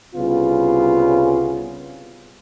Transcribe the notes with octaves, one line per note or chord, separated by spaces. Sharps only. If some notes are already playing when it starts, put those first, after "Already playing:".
C2 C#3 B3 F4